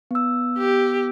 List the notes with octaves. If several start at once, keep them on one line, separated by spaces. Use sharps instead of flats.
B3 E6
G4